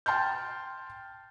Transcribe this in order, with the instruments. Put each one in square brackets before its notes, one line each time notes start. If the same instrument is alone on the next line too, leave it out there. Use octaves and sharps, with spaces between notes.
[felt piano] G5 A5 C6 F6 G6